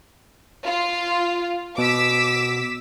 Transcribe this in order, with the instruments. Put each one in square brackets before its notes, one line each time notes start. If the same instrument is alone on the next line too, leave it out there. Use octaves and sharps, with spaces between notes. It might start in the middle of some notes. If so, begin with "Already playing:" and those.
[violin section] F4
[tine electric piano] B2 [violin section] D6 E6 B6